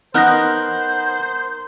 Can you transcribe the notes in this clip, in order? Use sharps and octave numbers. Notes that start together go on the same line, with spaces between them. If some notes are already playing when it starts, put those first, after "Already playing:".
B3 D#4 A#4 C5 F6 F#6 A#6